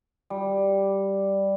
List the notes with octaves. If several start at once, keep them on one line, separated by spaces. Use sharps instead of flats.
G3